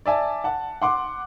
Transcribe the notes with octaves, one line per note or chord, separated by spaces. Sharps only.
D5 E5 G#5 A5
F#5 A5
F#5 C6 D6